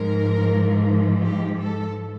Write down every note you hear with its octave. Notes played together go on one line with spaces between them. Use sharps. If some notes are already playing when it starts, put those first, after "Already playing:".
Already playing: G#2 F3 A#4
G4
A4